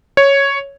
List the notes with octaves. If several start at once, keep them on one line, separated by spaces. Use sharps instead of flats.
C#5